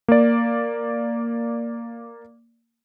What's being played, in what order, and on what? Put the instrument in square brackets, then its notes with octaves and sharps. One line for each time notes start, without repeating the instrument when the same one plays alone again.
[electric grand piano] A#3 D5